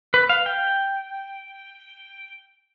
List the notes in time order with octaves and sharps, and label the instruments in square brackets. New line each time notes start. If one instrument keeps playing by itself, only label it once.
[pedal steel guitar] B4
F5
G5